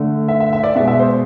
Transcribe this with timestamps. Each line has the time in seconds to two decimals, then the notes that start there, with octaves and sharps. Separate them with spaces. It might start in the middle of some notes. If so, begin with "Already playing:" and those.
Already playing: D3 A3
0.28 E5
0.40 E5
0.53 E5
0.64 D5
0.75 B2 E5
0.79 G#3
0.88 E5
0.99 C5